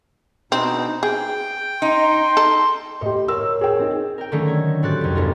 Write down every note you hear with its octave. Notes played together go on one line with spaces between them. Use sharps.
B2 C4 D4 D#4
G#4 G5
D#4 C6
A4
A2 G4 D#5 C6 C#7
A#4 C#5 E6
G#4 G5
C4 D#4
A#4 G5
D3 D#3 F#3 A3 C#4 D#4
G#6
A2 C4 F#4 G4 F#6 A6
C2 F2
G1 B3 D#4 F4